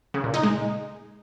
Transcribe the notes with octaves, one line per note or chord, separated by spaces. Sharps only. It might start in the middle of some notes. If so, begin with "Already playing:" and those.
C#3
A#2
D#4
G#3